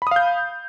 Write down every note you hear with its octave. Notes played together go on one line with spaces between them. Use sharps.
F5 B5 D#6 G6